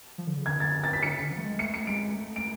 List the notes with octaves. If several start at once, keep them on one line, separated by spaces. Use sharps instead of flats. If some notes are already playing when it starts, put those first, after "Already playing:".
F3
D3
C#3
D3 G#6
A6
A6
B6
D3 C#7
C#3
D3
F3
A3
G#3
A3 C#7
C#7
G#3 D7
A3
D7